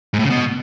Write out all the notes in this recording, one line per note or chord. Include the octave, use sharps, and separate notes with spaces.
G#2
A2
C#3
B2